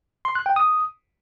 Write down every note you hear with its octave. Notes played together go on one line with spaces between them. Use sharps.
C6
F#6
G5
D#6